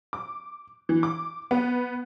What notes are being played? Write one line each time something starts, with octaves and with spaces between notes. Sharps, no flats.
D6
E3
D6
B3